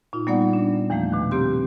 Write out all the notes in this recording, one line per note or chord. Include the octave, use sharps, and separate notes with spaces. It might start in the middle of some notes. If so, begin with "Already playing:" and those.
A#2 D#4 F4
G3 A#3 B3 D#4 D5 F#5
D4
E2 E3 F3 A3 A#3
B2 D#3
C#3 A#3 C4 G4 C6